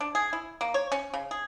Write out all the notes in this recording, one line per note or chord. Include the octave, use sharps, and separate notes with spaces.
D4
G#4
E4
A#3
C#5
C#4
C#3
G#4